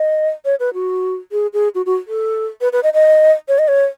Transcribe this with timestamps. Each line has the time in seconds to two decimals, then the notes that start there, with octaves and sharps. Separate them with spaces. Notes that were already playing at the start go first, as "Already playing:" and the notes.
Already playing: D#5
0.45 C#5
0.60 B4
0.74 F#4
1.32 G#4
1.53 G#4
1.75 F#4
1.86 F#4
2.07 A4
2.61 B4
2.73 B4
2.83 D#5
2.94 D#5
3.48 C#5
3.59 D#5
3.68 C#5